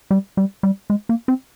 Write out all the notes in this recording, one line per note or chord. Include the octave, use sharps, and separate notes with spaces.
G3
G3
G3
G#3
A#3
C4